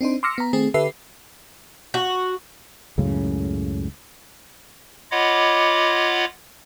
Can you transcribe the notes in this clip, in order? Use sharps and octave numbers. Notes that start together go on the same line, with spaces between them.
C4 D4 D#4 C5
C6 D6 E6 F6 A#6 C#7
B3 A#5
D#3 A3 C4 G#4
D3 G4 A4 B4 E5 C7
F#4
C#2 F#2 A2 C#3
F4 C#5 D#5 F#5 B5 D6